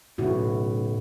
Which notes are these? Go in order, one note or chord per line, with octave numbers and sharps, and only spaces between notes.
B1 A2 C#3 E4 F#4